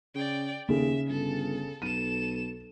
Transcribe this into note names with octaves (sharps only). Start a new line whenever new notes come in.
C#3 D5 G5
D#2 C#3 G#4 E5
G1 A4
B1 A4 D#7 E7